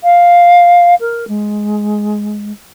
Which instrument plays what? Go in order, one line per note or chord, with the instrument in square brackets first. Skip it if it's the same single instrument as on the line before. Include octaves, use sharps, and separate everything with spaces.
[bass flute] F5
A#4
G#3